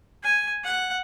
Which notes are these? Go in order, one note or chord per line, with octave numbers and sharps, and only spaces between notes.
G#5
F#5